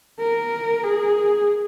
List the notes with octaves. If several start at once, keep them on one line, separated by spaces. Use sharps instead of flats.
A#4
G#4